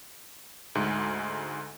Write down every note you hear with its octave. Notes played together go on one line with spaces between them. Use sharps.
D2 G#2